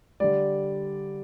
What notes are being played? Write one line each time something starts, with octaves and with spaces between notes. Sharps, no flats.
D3 G3 D5